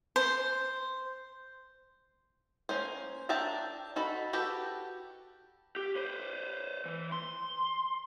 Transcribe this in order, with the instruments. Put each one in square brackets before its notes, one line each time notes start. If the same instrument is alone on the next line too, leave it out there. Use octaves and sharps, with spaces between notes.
[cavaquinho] C5
[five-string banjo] A#3 C#4 C5
D4 A#4 E5 G5 A5
D#4 F#4 A4 B5
F#4 G4 A4 B4
[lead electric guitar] G4
B4 C5
E3
C6